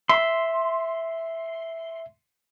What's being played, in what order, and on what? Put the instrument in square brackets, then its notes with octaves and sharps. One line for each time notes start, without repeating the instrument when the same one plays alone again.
[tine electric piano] E5 [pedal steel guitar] C6